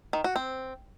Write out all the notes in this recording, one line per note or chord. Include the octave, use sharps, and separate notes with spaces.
D#3
F#4
C4